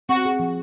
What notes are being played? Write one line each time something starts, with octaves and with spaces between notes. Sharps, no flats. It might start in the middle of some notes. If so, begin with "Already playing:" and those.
C4 F#4
G#4
F3